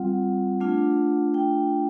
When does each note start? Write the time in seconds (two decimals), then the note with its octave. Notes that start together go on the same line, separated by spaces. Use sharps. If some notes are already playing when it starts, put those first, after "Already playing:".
Already playing: G3 C4 F4 F#5
0.60 A3 D4 F4
1.34 G5